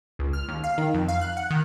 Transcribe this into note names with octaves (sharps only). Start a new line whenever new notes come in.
C#2
F6
D#2
F5
D#3
F2
F5
F#6
F#5
D#3